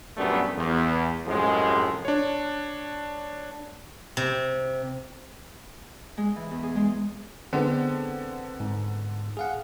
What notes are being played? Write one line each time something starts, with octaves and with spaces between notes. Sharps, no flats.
A#1 F#2 G3 A3 B3 D4
E2
F#2 A2 C3 F3 G#3
D4 C#5
C3
G#3
E3
E2
G#4
G#3
D3 G#3 B3 C4
G#2
G#4 F5 F#5